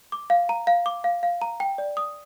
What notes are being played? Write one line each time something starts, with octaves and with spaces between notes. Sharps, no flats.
D6
F5
A#5
F5
D6
F5
F5
A#5
G5
D5
D#6